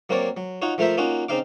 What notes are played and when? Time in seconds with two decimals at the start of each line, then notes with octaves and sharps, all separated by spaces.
0.09 F#3 A#3 C4 A#4 C#5 D5
0.37 F#3
0.62 D#4 F4 F#4 C#5
0.78 F3 A3 F4 A#4 C5 E5
0.97 A#3 C#4 D#4 F4 F#4
1.29 C#3 C4 D#4 F5 D6